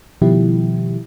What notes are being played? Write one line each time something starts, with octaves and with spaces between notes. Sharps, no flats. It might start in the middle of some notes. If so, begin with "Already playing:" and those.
B2 D#3 F3 G3 E4 G4